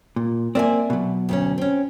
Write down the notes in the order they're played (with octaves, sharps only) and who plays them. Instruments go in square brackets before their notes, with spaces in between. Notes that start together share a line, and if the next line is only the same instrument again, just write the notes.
[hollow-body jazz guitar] A#2
[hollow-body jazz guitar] A#3 C4 [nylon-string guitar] D5 E5 G#5
[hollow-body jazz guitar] B2 F#3
[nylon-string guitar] D2 A3 C#4
C4 C#4